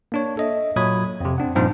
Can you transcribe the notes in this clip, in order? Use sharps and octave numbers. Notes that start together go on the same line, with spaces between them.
A#3 D4 C#5
A4 D#5 E5
A#2 F#3 C#5 B5 D#6 G#6
F2 C3
C4 D4 F#5
G2 A#2 F3 C4 D4 D#4